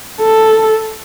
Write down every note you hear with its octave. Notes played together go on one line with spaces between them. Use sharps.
A4